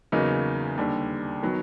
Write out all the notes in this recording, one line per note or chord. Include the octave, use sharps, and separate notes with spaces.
E2 C#3 F#3 A#3 D#4
D#2 D3 G3
D#3 F#3 B3